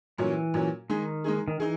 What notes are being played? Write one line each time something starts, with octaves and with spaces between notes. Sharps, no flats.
A#2 E3 F#3 C#4
A#2 F#3 C#4
D#3 G#3 D#4 G#4
G#3 D#4 G#4
D#3
E3 D#4 G#4